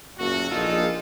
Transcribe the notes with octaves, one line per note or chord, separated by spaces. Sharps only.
F#1 A#2 A3 F#4
A#1 A#2 G#3 D#4 F4 A4